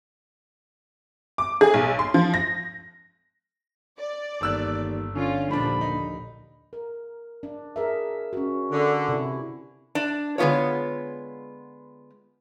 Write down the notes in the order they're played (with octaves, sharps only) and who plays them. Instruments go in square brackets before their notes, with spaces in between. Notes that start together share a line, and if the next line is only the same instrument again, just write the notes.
[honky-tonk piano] D6
G#4
B1
C6
F3
A#6
[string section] D5
[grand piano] G1 E6 F#6 [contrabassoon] D#2
[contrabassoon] D3 [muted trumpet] C#4 [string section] F4
[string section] A#1 D#2 [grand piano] F3 D4 [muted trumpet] B5
[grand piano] D#4
[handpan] A#4
D4
G#4 A#4 E5
C#4 F#4
[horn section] D3
[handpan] C3 E4
[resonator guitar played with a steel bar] D4
D3 G#3 B3 F4 C#5